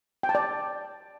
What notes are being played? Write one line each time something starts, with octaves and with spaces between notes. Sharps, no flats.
G5
A5
D5